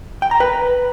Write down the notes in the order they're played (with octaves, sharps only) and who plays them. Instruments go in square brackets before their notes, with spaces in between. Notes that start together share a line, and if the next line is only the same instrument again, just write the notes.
[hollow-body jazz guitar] G5
A#5
B4